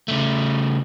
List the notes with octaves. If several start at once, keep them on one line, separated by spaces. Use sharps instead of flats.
C#3 A3